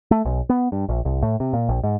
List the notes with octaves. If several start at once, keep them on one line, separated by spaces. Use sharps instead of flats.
A3
B1
B3
G2
A#1
C2
A2
C3
A#2
A#1
G#2